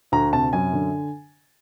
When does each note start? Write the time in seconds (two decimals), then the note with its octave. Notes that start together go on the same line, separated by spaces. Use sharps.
0.12 D2 A#5
0.33 C3 A5
0.53 F#2 G#5
0.73 D3